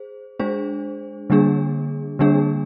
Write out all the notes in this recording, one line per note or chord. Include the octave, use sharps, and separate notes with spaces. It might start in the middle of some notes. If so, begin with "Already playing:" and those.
Already playing: G#4 C5
G#3 D4 G#4 C5
D3 G3 A#3 D4 G#4
D3 G3 A#3 D4 G#4